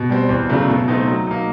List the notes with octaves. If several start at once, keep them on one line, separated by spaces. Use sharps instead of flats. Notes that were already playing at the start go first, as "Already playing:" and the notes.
Already playing: B2
G3 C4
E2
C#3 F#3 A3 D4
B2
F#3 A3 C4 D#4
F#3
A#3 D#4